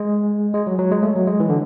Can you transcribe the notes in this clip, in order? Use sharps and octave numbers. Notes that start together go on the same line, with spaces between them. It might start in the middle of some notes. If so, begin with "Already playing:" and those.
Already playing: G#3
G#3
F#3
F#3
G#3
A3
F#3
G#3
E3
D3